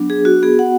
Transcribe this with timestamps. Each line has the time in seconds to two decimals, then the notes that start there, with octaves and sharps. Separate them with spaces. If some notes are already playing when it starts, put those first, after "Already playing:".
Already playing: F#3 B3 D4
0.10 G#4
0.25 F#4
0.43 B3 F#4 G#4
0.59 F#5